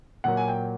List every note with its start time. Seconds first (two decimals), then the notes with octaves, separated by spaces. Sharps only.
0.24 A#2 F#3 A#3 F#5
0.37 G#5
0.48 G5